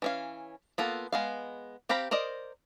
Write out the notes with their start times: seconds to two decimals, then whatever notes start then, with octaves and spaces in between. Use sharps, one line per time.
0.02 E3 C#4 F5
0.78 A#3 B3 F4 A4
1.12 G#3 B3 F5
1.89 C4 G4 F5 A#5 B5
2.11 A#4 C5 D5 D#5